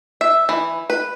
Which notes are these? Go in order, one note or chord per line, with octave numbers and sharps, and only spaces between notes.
E5
E3
B4